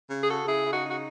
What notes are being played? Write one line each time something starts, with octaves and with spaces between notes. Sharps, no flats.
C#3
G#4
F#4 A4
C#3 E4 G#4
E4
D#4 F#4
D#4 F#4